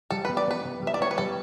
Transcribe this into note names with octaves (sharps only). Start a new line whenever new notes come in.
G3 A4
B4
B3
D5
B3 B4
B3
G3
E5
D5
B3 C#5
B4
G3 A4